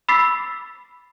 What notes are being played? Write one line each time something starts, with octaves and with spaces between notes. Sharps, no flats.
B5 D6 E6 A6 B6 C7